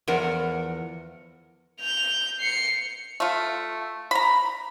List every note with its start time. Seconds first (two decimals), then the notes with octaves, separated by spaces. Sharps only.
0.08 E2 F3 A#4 F#5
1.80 G6 F7
2.40 C7 C#7
3.20 A3 F4
4.11 A#5 B5